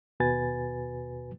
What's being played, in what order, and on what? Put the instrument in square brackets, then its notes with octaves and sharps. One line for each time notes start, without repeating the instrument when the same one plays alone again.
[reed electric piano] D#2 B2 F#4 B4 G#5 A6